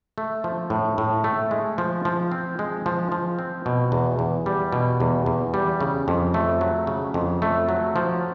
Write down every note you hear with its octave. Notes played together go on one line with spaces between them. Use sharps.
A3
F3
A2
A2
A3
G#3
F3
F3
C4
G#3
F3
F3
C4
B2
E2
E2
G3
B2
E2
E2
G3
C#3
F2
A3
F#3
C#3
F2
A3
F#3
F3